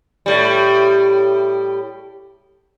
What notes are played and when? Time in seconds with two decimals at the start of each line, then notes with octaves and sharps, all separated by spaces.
0.26 A2 G3